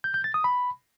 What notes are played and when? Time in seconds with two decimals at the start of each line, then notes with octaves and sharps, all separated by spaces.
0.04 G6
0.14 G6
0.24 A6
0.34 D#6
0.44 B5